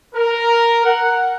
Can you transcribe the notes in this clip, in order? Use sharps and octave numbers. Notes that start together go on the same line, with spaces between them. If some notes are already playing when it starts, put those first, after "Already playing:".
A#4
F#5